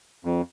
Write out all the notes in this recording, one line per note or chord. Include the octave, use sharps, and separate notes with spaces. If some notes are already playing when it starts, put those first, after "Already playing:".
F2